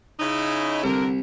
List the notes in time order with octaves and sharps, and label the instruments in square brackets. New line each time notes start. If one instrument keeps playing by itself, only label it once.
[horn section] C#3 D#4 E4
[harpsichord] C2 [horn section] D3 A#4